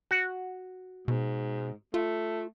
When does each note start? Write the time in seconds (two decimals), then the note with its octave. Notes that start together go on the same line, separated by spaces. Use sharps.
0.11 F#4 F#5
1.08 G#2 B2
1.94 A3 F4